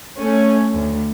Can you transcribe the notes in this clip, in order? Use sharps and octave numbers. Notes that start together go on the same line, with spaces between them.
A3 C#4
D2